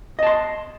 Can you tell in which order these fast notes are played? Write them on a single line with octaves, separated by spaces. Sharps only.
D#5 A5 C6